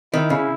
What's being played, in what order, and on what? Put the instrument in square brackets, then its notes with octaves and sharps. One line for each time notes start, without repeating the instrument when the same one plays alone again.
[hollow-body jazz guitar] D#3 [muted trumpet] E4
[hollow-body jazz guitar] C#3